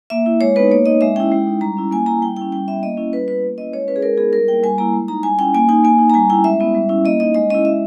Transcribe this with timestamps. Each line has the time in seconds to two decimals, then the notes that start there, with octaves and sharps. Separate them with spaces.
0.10 A#3 E5
0.26 E4
0.41 G#3 C#5
0.56 B3 D#4 B4
0.71 A#3 C#5
0.86 D#4 D#5
1.01 G#3 E5
1.16 C#4 E4 G5
1.32 G#3
1.47 D#4
1.61 G3 A#5
1.77 C#4 E4
1.91 A#3 G#5
2.06 E4 A#5
2.21 G3 G5
2.36 C#4 E4 G5
2.52 G3 G5
2.67 B3 E4 E5
2.82 A#3 D#5
2.97 C#4 E4
3.13 G3 B4
3.28 B3 E4 B4
3.43 A#3
3.57 C#4 E4 D#5
3.72 G#3 C#5
3.87 C#4 E4 B4
3.96 G#4
4.02 G#3 A#4
4.18 B3 D#4 G#4
4.33 G3 A#4
4.48 A#3 E4 G5
4.63 G3 G#5
4.78 A#3 E4 A#5
4.93 G#3
5.08 D#4 A#5
5.23 G3 G#5
5.38 C#4 E4 G5
5.54 A#3 G#5
5.69 D#4 G#5
5.84 A#3 G#5
5.99 D#4
6.10 A#5
6.14 G3 G#5
6.30 C#4 E4 G5
6.44 G#3 E5
6.60 B3 E4
6.74 G3
6.89 C#4 E4
7.05 A#3 D#5
7.20 D#4 D#5
7.34 G#3 D#5
7.50 C#4 E4 D#5
7.65 G#3 E5